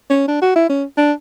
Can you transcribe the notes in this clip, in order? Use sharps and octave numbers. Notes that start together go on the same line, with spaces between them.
C#4
D4
F#4
E4
C#4
D4